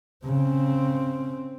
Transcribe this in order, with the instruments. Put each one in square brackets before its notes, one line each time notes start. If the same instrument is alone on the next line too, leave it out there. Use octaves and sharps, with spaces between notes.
[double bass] C#3 C4